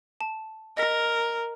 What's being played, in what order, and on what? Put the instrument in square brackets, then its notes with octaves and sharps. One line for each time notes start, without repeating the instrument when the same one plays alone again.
[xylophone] A5
[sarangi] A#4 [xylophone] D#5 A#6 B6